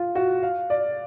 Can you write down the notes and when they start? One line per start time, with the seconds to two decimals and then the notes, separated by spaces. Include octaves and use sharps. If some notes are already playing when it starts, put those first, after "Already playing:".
Already playing: F4
0.15 F#4
0.43 F5
0.70 D5